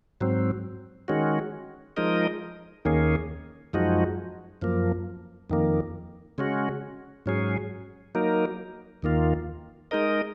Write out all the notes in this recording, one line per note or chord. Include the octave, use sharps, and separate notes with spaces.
G#2 F#3 C4
D#3 G#3 C#4 F#4
F3 G#3 D#4 A#4 D#5
D#2 D#3 A#3 C#4 G#4
F#2 F3 G#3 D#4 F#4
F#2 F3 A#3
F2 D#3 A#3
C#3 G#3 C#4 F#4
G#2 F#3 C#4 G#4
F#3 A#3 D#4 A#4
D#2 D#3 A#3 F4
G#3 D#4 A#4 D#5